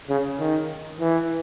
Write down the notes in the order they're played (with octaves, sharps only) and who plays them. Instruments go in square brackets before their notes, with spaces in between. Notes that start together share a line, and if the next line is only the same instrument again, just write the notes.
[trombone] C#3
D#3
E3